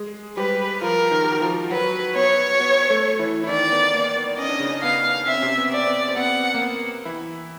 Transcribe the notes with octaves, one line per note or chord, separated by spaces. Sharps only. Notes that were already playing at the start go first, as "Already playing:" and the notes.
Already playing: G#3 G#4
G3 G4 B4
F3 F4 A#4
D#3 D#4
G4
F#4
F3 F4
F#3 F#4 B4
B3 B4 C#5
B3 B4
A3 A4
E3 E4
E4
D#3 D#4 D5
B3
A#3
B3
C#4 D#5
D4
C#3 C#4
B3 F5
C4 E5
C#4
C3 C4
B3
D5
C4
B3
C4
B3 F#5
A#3
B3
E3 E4